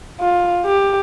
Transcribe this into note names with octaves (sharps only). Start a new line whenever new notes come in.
F4
G4